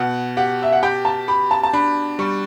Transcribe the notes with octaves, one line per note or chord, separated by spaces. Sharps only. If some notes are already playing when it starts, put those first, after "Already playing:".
Already playing: B2 F#5
G4 F#5
E5
F#5
G4 G5
A5
G4 B5
A5
A5
D4 B5
G3 C#6